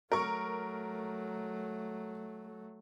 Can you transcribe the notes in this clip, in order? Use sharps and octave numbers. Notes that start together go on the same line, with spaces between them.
F#3 A3 A#4 C#6